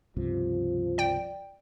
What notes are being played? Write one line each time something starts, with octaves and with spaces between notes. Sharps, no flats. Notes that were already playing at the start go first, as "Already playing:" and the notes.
C#2 G2 C3 F3
D5 G5